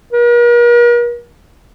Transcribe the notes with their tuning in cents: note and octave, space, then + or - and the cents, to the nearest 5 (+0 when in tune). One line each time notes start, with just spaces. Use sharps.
A#4 +45